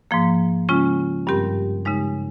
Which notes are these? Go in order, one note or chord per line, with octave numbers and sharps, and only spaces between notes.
G#2 F3 A#3
C#3 G#3 C#4 F4
G2 G3 C4 G4 A#4
C#3 G#3 D#4